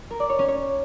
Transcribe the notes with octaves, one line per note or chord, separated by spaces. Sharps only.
A#4
D5
C#5
C#4
C#5